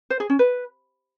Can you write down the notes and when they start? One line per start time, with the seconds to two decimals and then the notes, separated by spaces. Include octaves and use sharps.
0.10 C5
0.20 G#4
0.30 C#4
0.39 B4